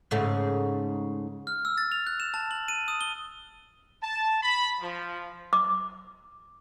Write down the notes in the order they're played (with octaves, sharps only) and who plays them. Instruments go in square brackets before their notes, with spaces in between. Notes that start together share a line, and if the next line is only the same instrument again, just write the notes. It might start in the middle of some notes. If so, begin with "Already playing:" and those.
[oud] G#2 C#3 A3
[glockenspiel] F6
E6
A6
F7
F#6
E7
A5
F#7
D#7
D#6
G7
[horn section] A5
B5
F3
[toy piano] D6